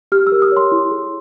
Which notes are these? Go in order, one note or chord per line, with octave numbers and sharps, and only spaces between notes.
G4 F6
E6
A#4
D#6
C#5 C6
E4
G#4